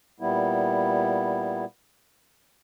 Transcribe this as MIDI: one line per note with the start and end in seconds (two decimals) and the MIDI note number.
0.20 1.65 46
0.20 1.65 55
0.20 1.65 59
0.20 1.65 64